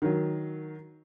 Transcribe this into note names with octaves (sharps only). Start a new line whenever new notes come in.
D#3 F#3